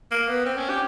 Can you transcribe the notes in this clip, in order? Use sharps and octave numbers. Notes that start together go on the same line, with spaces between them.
A#3
B3
C4
C#4
G4